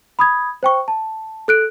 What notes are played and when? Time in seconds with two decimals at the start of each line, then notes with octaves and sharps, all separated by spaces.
0.19 B5 D#6 G#6
0.63 C5 G5 C#6
0.88 A5
1.48 A4 F#6 D7